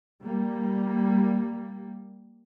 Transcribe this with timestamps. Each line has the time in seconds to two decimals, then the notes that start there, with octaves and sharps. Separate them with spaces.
0.24 G3 A#3